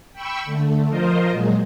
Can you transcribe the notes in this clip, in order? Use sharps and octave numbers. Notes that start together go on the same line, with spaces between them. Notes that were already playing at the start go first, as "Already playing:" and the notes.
G5 B5 C#6 E6
D3 A3
F3 F4 A#4 C5 D#5
A#2 F#3 G#3